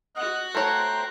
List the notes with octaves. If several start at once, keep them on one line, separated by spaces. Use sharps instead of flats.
F#4 D#5 F#5
A3 C5 C#5 G5 A#5